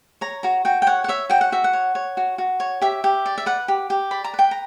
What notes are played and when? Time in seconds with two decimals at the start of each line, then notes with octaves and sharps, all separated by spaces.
0.21 C#5 A#5
0.43 F#4 A#5
0.65 F#4 G5
0.82 G5
0.87 C#5 F#5
1.04 F#5
1.08 C#5 E5
1.30 F#4 G5
1.41 F#5
1.52 F#4 E5
1.64 F#5
1.73 C#5
1.95 C#5
2.17 F#4
2.38 F#4
2.60 C#5
2.81 G4 E5
3.04 G4
3.26 D5
3.38 E5
3.46 B4 F#5
3.68 G4
3.90 G4
4.11 D5 B5
4.24 A#5
4.34 B4
4.39 G5
4.51 A#5